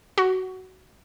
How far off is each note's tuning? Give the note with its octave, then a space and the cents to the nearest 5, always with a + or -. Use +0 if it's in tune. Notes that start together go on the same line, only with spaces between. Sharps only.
F#4 +20